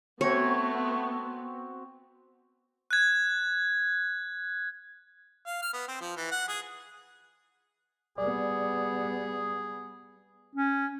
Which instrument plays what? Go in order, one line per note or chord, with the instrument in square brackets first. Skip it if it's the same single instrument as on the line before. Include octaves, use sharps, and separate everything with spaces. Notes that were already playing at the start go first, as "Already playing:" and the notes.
[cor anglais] A3 [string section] B3 [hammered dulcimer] C4 F#4 [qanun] C#5
[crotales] F#6 G#6
[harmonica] F5
F6
B3
C4
F3
E3
F#5
G#4
[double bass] G3 B3 [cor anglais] G#4 [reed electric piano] D5
[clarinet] C#4